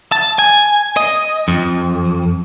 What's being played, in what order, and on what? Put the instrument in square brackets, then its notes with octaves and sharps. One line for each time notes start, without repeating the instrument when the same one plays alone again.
[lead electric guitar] A5
G#5
D#5
F2